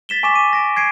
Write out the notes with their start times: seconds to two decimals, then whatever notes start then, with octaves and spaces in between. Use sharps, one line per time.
0.09 A6 B6 E7 G7
0.23 G#5 C#6 D6 B6 E7
0.35 D#7
0.53 A#6 D7 E7
0.77 G#6 C7 D7 D#7